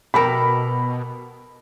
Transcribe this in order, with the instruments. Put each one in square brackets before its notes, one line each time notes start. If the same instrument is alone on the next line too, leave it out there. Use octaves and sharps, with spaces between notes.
[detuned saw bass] B2 [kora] G4 A4 A#4 [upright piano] B5